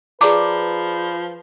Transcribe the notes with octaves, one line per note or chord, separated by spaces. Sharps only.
F3 G#4 B4 D5 A#5 D6